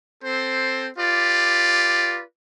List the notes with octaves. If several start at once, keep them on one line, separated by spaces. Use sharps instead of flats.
C4 A4 C5
F4 G4 B4 D5